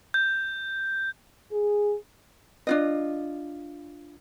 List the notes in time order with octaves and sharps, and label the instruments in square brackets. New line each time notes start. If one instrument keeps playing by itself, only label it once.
[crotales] G6
[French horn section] G#4
[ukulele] D4 F4 D#5